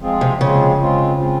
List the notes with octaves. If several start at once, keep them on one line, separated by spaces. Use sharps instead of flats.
F3 G#3 C4 F4 G#4
C3
C#3 F3 G#3 C4 F4 G#4
G#3 C4 F4
G#3 C4 F4